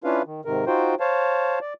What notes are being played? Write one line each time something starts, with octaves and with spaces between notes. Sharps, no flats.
C#4 D4 E4 F4 B4 F5
D#3
G#2 C3 D#3 A#4
D#4 F4 F#4 C5 G5
C5 C#5 F5 A5
D5